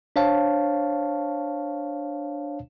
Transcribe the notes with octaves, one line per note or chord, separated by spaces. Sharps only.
D4 C5 C#5 F5 A5